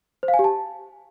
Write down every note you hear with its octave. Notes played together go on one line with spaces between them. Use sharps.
C5
F5
G#5
G4
A5